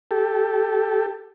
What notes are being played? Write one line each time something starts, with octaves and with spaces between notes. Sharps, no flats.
G4 A4